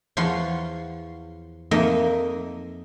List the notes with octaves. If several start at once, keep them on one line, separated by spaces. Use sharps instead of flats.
E2 F3 C#5 F#5 C6
F2 A#3 D#4 D#5 E5